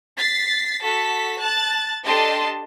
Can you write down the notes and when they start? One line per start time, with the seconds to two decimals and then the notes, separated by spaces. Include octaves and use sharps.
0.17 A6 B6 C7
0.82 F#4 A4 B6
1.39 A5 F#6 A6
2.04 D4 G4 A4 D#5 A5 C6